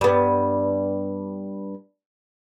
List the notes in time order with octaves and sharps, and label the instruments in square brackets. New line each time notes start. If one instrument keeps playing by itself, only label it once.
[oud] G2 B3